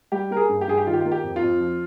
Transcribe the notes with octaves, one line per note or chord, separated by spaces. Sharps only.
G3 G4
A#3 A#4
G#4
G2
G4
G2 G#4
G4
D#3 F4
G4
F4
A#3
G4
F2
F4
F2
F3